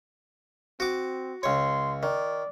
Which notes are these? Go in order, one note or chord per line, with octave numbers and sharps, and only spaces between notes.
C4 F#4 D6
C#2 C#5 C6
D#3 D5